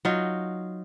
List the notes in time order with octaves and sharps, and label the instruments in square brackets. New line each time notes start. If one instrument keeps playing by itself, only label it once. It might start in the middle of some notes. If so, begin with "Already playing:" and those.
[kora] F#3 D#4 F4